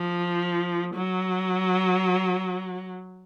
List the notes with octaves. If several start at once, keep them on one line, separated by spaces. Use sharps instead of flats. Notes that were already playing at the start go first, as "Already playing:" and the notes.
Already playing: F3
F#3